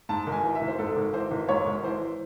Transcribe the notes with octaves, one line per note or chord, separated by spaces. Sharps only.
G#2 A5
G#1
G#5
E3
E5
G#1
C5
G#2 A4
G#1
E3 C5
G#1
G#2 C#5
G#1
E3 C5